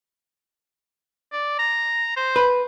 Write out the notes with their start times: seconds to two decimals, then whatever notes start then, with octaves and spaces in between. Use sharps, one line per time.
1.32 D5
1.59 A#5
2.17 C5
2.36 B4